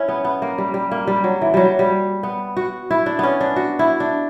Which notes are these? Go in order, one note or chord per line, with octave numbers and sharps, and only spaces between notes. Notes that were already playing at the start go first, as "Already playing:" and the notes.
Already playing: C#4 E4
B3
B3
A#3
G3
G3
A#3
G3
F#3
E3
F#3 G3
G3
B3
F#4
E4
D4
B3 C#4
D4
F#4
E4
D4